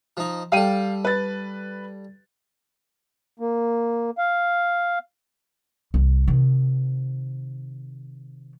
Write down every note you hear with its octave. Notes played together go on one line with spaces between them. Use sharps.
F3 D#4
G3 A4 F5 G5 D#7
B4 A6
A#3
F5
C2
C3 D#3